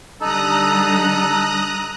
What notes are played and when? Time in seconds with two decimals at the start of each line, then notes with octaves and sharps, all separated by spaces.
0.21 D3 G3 D#4 A4 A#5 D#6 F#6